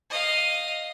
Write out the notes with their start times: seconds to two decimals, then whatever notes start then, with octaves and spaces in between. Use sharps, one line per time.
0.10 D#5 F5